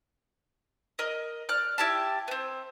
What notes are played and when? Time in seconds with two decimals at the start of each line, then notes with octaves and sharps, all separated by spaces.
0.99 A#4 D#5
1.49 D5 F6 F#6
1.78 E4 G4 A5
2.28 B3 C4